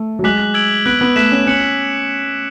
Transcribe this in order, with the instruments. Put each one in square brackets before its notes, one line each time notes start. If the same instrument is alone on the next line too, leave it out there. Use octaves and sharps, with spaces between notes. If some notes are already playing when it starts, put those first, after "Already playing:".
Already playing: [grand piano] A3
F#3
[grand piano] G#3 [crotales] D6 F#6 B6 F#7
[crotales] E6 G#6 D7 F#7
[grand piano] B3 [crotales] F#6 B6 D7 F#7
[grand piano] B3
[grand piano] A3 [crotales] F#6 B6 E7
[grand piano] C#4
[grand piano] C#4 [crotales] D6 F#6 C#7 F#7